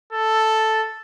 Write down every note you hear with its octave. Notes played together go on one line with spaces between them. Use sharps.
A4